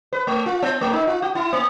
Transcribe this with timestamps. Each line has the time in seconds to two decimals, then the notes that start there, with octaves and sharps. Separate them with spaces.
0.13 B4
0.27 A3
0.46 F4
0.63 B3
0.81 A3
0.93 D#4
1.07 F4
1.22 F#4
1.35 E4
1.53 A#3